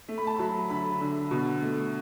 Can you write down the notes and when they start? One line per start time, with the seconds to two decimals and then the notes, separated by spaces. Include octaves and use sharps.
0.08 A3
0.18 B5
0.27 A5
0.37 F#3 B5
0.70 D3 B5
1.00 D3
1.31 B2
1.62 A3